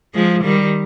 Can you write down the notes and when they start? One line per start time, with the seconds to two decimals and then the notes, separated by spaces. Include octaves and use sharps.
0.14 F3 G#3
0.44 D#3 G3